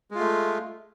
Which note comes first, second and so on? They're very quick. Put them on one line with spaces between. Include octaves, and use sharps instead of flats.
G#3 F4 A3